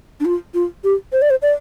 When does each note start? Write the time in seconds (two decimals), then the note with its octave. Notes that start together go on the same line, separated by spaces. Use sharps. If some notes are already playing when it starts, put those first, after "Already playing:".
0.20 D4
0.25 F4
0.54 F4
0.84 G4
1.13 C5
1.22 D5
1.30 C5
1.42 D5